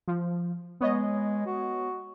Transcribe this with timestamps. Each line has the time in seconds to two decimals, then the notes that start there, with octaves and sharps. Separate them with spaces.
0.08 F3
0.81 G#3 B3 C#5 D#5
1.46 F#4